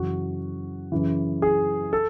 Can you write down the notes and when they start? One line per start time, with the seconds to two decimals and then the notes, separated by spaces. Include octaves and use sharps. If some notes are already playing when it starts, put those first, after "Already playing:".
Already playing: F#2 C#3 E3 F#4
0.92 F#2 C#3 E3
1.42 G#4
1.93 A4